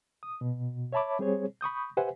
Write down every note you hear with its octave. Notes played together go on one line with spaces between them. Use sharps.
D#6
B2
C#5 E5 A5 B5 D6
G3 C4 G#4 C5 C#5
B5 C#6 D#6 G6
G4 B4 C5 E5 F#5 G#5